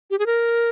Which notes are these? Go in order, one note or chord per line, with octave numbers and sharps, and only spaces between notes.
G4
G#4
A#4